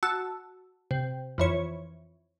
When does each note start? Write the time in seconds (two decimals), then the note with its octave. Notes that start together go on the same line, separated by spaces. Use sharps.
0.03 F#4 A5 E6
0.91 C3
1.38 F2 E3 C#5